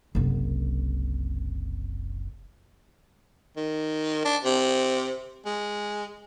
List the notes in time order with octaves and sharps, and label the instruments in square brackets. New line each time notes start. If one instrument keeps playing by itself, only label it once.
[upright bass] F#1 C2
[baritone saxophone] D#3
D4
C3
G#3